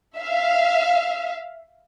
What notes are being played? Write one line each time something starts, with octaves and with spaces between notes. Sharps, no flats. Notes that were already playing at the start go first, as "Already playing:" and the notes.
E5 F5